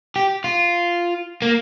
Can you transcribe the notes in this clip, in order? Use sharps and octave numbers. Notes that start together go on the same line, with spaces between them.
G4
F4
A#3